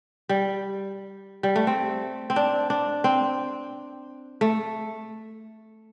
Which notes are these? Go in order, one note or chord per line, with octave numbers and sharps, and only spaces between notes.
G3
G3
A3
C4
C4
D4
D4
C4
A3